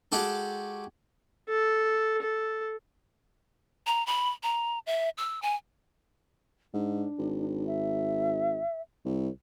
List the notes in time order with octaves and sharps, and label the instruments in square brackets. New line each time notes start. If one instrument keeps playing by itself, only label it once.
[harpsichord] G#3 F#4 G4 A4 A5
[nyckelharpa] A4
A4
[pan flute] A#5
B5
A#5
E5
E6
G#5
[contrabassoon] G#2 [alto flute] D4
[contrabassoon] G#1
[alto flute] E5
[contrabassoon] C2